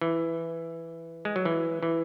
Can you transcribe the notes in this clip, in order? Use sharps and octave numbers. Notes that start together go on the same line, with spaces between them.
E3
G#3
F#3
E3
E3